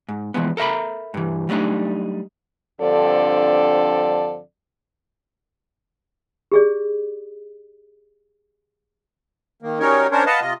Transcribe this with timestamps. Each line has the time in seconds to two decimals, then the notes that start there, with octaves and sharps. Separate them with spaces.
0.09 G#2
0.34 E3 F3 G#3 B3
0.57 A4 A#4 E5 A#5 B5
1.14 G2 E3
1.49 F#3 G3 A3 D4 D#4
2.82 G2 D3 F3 C4 A4 D5
6.52 G4 G#4 D5
9.62 D#3 A#3
9.80 F#3 G3 C#4 D#4 A#4 C#5
10.11 C#4 D4 A#4 C5 C#5
10.26 B4 D#5 F5 F#5 A5
10.41 C3 F4 D#5